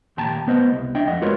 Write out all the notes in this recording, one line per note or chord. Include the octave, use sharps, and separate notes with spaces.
D#2 A#2 G5 A5 A#5
B3 B4 C5 D#5
C2
D4 D#5 E5 G5
F2 D#5 F#5
G#3 F4 F#4 A#4 B4 C#5